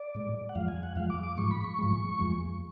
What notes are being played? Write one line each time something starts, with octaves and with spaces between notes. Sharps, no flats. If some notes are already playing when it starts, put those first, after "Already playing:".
Already playing: D5
A2 G#3
F#5
F2 F3 G#3 F5
G#5
F#5
F2 F3 G#3 F5
D6
D6
G#2 F3 G#3 C#6
B5
C#6
G#2 F3 G#3
F2 F3 G#3